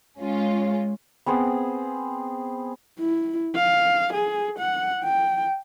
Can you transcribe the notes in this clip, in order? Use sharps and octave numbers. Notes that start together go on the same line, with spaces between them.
G#3 C#4 F4
B3 C4 G#4 C5
E4
F5
G#4
F#5
G5